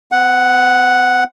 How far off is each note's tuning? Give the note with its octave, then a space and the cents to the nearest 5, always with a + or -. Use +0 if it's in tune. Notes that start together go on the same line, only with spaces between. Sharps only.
C4 -45 F#5 +0